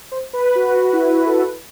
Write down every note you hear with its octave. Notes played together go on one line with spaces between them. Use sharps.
C5
B4
F#4
F#4
E4
F#4
A4
B4